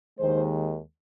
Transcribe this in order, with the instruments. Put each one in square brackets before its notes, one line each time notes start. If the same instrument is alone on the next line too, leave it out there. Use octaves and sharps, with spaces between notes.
[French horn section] D#2 D#3 G#3 C5